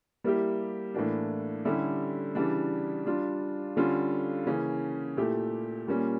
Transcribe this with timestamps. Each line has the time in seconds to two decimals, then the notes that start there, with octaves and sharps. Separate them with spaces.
0.24 G3 A#3 E4 G4
0.94 A2 E3 A#3 D4
1.65 D3 G3 C#4 E4 G4
2.35 C#3 E3 G3 D4
3.06 G3 D4 F4
3.77 D3 G3 C#4 F4
4.46 C#3 E3 A#3 C#4
5.17 A#2 A3 E4 G4
5.87 A#2 G3 A#3 C#4